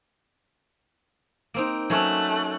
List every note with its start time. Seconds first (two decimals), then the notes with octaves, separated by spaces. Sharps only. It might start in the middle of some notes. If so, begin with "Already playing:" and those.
1.54 A#3 C4 D#4
1.90 F#3 A3 C#4 F#6